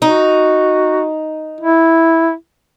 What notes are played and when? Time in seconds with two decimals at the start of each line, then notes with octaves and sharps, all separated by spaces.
0.02 D#4 F#4
1.61 E4